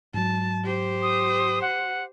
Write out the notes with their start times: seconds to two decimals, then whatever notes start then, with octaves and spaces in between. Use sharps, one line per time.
0.14 G#2 F#3 A5
0.64 G4 C5
1.02 D#6
1.62 F#5